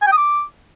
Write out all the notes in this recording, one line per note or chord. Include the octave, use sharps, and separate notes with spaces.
G#5
G5
D#6
D6